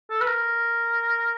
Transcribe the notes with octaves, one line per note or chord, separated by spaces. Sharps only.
A4
B4
A#4